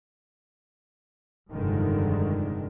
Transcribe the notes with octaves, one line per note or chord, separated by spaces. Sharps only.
F1 G2 D3 D#3 G#3